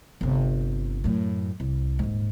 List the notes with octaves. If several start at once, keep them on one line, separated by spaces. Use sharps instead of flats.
G1 C3
F#2 A2
C2
D#1 G#2